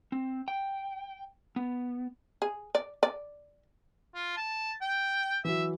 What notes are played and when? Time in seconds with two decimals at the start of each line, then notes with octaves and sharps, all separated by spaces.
0.12 C4
0.48 G5
1.56 B3
2.42 G#4
2.75 D5
3.03 D5
4.15 F4
4.37 A5
4.82 G5
5.44 E3 F#3 E5